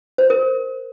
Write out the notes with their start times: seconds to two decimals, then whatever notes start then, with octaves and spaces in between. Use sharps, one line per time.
0.18 C5
0.30 A#4